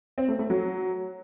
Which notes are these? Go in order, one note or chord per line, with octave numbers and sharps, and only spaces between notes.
C4
A3
A3
F#3